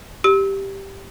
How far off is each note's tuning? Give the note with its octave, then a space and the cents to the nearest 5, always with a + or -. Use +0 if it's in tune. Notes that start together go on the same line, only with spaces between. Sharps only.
G4 +0 E6 -30